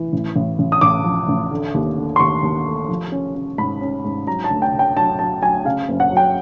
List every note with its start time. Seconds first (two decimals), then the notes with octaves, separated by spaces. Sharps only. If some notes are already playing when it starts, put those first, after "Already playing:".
Already playing: E3
0.13 A1
0.36 A1
0.59 A1
0.72 D#6
0.81 A1 D6
1.04 F3
1.28 A1
1.51 D3
1.74 D#2
1.97 D3
2.16 C6
2.20 D#2 C#6
2.43 D#2
2.66 A3
2.89 F3
3.12 C#4
3.35 C#4
3.58 G#2 B5
3.81 C#4
4.04 G#2
4.27 F#3 A#5
4.44 A5
4.51 D2
4.62 G5
4.73 D3
4.79 G5
4.97 F#3 A5
5.19 F#3 A5
5.42 F#3 G#5
5.65 C#3 F5
5.89 F#1
6.00 F#5
6.11 F#3
6.17 G5